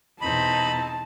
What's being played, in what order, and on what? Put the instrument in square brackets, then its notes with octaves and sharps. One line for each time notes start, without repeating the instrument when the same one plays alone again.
[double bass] E2 B2 [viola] C4 D#4 [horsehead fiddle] A5 [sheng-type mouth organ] B5